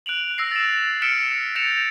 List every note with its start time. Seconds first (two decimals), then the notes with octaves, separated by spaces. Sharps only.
0.06 F#6 D7 F7 F#7
0.38 E6 A#6 C7
0.51 A6 D7 E7
1.02 E6 F6 B6 C#7 D7 E7
1.55 G6 A6 A#6 C#7 E7 F7